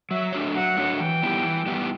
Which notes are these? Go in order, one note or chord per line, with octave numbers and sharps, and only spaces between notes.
F#3 E5
A3 D4 F#4 C#5
F#3 F#5
A3 D4 F#4 C#5
E3 G5
G3 B3 E4 G4
E3
G3 B3 E4 G4